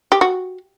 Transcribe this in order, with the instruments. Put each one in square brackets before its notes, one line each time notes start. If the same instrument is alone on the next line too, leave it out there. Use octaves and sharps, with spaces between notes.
[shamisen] G4
F#4